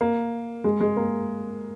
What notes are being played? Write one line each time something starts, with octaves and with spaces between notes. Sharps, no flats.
A#3
G#3
G#3
A#3